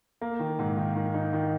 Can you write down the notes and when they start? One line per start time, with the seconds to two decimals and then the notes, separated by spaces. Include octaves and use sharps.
0.21 A#3
0.39 D#3
0.59 G#2
0.77 D#3
0.96 D#3
1.14 D#4
1.33 D#3